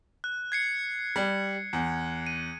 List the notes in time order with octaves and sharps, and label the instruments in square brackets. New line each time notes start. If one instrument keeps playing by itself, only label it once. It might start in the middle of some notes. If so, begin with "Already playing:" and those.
[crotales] F#6
G#6 C7 C#7
[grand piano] G3
E2
[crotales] D#7